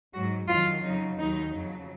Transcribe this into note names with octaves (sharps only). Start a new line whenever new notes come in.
G#2 F#3 F#4
F2 D#3 F#3 F4
F2 C#3 F#3 D#4
D#2 D#3 F#3 D#4
F2 C#3 F#3